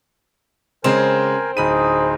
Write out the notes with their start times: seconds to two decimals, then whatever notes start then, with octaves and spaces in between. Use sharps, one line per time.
0.84 C#3 G#3 C4 A#4 C5 G#5 E7
1.57 D1 D#4 G#4 C5 B5 D#7